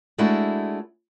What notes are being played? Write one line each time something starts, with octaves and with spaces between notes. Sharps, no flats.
G#3 A3 D4 E4 F#4